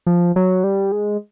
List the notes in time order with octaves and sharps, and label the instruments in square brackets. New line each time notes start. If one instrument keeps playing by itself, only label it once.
[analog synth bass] F3
F#3
G3
G#3